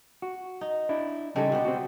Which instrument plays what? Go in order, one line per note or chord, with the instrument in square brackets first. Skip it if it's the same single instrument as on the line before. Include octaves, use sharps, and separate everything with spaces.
[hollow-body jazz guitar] F#4
[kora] D#4
[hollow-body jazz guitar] D4 E4
[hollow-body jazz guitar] C#3 D#4 A4 [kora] G3 G#3 C4
[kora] B2 B3 G4
[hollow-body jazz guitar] C4 F#4